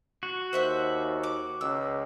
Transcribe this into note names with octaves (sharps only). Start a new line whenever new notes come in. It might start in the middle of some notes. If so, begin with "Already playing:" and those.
F#4
D#2 C5 E5 F#5
D6
C#2 E6